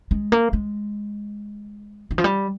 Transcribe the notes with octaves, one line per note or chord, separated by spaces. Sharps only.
G#3
A#3
G#3
D#3
F3
G3